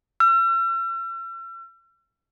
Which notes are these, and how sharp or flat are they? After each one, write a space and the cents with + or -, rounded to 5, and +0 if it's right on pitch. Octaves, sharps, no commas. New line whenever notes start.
E6 +45